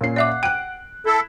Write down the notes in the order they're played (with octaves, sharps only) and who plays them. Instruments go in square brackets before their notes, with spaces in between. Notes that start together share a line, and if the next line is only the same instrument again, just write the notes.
[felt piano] A#2 C#4 C7
[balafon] D5 E5 D6 [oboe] F#5
[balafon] G5 [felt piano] F#6 D7
[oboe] E4 [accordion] A4